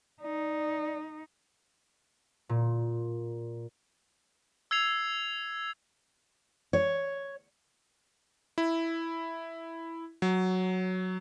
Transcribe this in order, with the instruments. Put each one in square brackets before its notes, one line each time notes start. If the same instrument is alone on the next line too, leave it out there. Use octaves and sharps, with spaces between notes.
[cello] D#4 [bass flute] D5
[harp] A#2
[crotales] E6 G#6 C7 F7
[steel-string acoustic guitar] C#5
[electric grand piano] E4
F#3